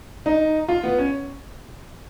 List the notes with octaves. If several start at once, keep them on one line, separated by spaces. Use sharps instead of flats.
D#4
F4
B3
C#4